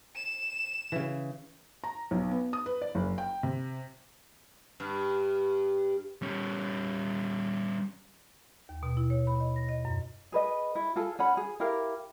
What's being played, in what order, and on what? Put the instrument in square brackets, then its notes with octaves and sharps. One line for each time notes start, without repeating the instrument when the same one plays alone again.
[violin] E7
[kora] C#3 E3
[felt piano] A#5
B1
B3
D#6
B4
D5
F#1
G5
C3
[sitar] G2
[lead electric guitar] G3 C#4
[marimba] D#2
B2
E4
C#5
B5
D#5
A#6
D#5
F#2
[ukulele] G#4 B4 D#5
E4
F4 G#4 A4
C#4 F#5 B5
G#4
E4 G4 A#4 F5